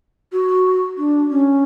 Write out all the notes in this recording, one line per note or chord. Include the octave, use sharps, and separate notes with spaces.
F#4
D4
C#4